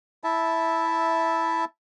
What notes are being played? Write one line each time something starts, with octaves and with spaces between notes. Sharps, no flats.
E4 E5 A5